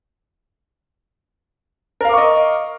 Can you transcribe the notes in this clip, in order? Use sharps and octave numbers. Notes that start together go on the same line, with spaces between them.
A#4 D#5 F5 C#6 D6